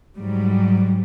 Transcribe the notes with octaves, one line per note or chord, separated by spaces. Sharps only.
G#2 F#3 G3